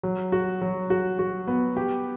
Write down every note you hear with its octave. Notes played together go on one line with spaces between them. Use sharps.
F#3
F#4
F#3
F#4
F#4
B3
G4